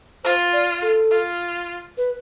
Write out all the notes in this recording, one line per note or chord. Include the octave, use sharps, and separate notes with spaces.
F4 C5
D5
A4
F4
B4